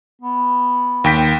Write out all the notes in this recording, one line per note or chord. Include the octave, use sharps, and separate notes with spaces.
B3
D#2 G5 B6